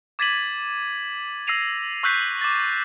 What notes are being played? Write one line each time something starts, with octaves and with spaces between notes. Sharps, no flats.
D6 G#6 A6 B6 D#7 F#7
E6 A#6 C7 D#7 F7
C#6 E6 F#6 G6 B6 C7
D6 A6